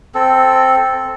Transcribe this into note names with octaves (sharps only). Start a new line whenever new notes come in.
C4 A4